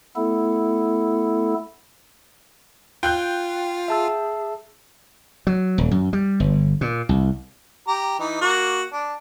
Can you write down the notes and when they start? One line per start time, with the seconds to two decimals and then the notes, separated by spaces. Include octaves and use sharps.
0.16 A3 B3 E4 A4
3.03 F4 G5 F#6 G6
3.88 G#4 E5 A5 E6
5.47 F#3
5.78 D#1
5.91 F#2
6.13 G3
6.40 G1
6.81 A#2
7.09 C2
7.88 G4 A#5
8.20 E3 D#4
8.41 A#3 F#4
8.92 D4